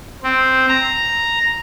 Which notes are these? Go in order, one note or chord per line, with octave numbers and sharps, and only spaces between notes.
C4
A#5